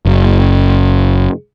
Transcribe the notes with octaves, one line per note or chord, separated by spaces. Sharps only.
F#1